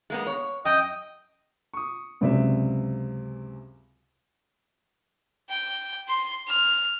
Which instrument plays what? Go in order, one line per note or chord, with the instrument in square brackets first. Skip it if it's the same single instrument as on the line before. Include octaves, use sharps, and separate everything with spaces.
[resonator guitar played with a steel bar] G#3 A#3 B3
C#5
[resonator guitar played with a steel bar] F#2 [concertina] D#5 G5 D#6
[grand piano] C#6 D#6
C#2 F#2 C3 C4 D5 E5
[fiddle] G5
C6
F6